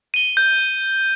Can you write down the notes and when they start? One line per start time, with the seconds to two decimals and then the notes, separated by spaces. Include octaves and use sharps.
0.14 D#7 G7
0.37 G6